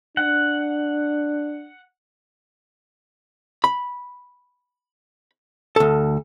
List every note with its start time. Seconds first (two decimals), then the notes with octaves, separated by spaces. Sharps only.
0.17 D4 F#5
3.64 B5
5.76 D2 A4